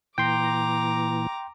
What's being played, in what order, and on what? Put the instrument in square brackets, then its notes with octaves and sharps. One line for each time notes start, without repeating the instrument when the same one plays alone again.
[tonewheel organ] A#2 E3 [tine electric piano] G5 C6 [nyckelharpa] A#5 D6